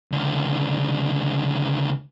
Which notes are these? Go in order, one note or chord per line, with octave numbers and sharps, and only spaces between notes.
C#2 D3